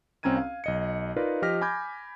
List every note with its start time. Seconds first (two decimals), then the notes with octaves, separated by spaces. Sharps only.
0.23 C2 C4 C#4 A#5 G#6 D#7
0.37 F5
0.64 B1 D#5 C#7
1.16 D#4 F4 A#4 B4 D5 F5
1.42 F3 G4 D#5 F6 A#6 B6
1.61 G#5 B5 D6 G6 G#6